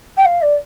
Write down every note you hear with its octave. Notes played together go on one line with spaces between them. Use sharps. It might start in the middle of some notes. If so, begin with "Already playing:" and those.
G5
F5
D5